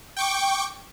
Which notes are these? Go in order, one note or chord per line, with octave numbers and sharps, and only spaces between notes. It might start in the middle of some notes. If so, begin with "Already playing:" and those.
G5 C#6 D6